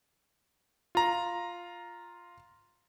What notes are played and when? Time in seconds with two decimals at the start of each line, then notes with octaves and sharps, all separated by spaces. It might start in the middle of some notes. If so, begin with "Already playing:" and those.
0.95 F4 A#5